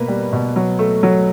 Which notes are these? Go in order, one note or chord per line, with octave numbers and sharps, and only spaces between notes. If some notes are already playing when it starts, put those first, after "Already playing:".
Already playing: B2 A#3 B4
G3
B2
F#3
A3
F#3